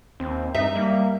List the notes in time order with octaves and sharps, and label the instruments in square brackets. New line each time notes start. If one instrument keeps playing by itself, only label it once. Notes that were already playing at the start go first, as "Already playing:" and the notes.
[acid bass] D#2 [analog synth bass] C4
[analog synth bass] G2 [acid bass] D#4 [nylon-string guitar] E5
[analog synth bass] G3 [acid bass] A#3